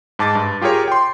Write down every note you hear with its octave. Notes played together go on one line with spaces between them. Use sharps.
G#2 A5 D6 A6
G2
F4 G4 G#4 A#4 C#5
G5 C6